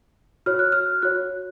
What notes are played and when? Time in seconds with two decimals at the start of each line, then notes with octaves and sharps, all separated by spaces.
0.46 F#4 C#5 F6
0.59 F#6
0.72 F6
1.02 F#4 C#5 F#6